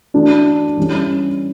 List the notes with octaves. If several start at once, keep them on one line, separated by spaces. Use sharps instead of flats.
E3 A3 D4 F#4
E3 G3 C#4